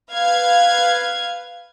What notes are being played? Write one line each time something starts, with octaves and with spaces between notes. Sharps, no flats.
B4 F5 G#6